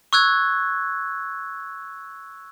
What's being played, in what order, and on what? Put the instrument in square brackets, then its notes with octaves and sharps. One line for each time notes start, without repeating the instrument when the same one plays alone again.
[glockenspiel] C#6 E6 F#6 G#6